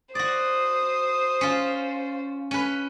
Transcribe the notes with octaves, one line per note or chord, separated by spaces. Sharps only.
F#4 C5 D5 D#6
C#4 F4
C#4 B4